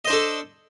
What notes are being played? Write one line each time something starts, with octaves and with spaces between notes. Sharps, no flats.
D4 A4 C5 D#5